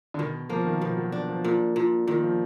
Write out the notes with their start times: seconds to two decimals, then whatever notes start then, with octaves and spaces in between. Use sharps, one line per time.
0.14 D3
0.19 B2 D#3
0.50 F3 A#3
0.66 D#3
0.81 B2 F3
0.97 F#3
1.12 D4
1.29 F3
1.44 A#2
1.76 A#2
2.07 A#2 D#3
2.23 F3